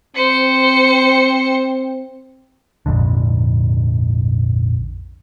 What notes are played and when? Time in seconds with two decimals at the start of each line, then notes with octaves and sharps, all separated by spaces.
0.16 C4 C5 C#7
2.86 A#1 F2 G#2 D3